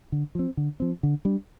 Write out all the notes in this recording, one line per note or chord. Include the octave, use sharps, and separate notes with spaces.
D3
F3 C4
D3
F3 C4
D3
G3 D4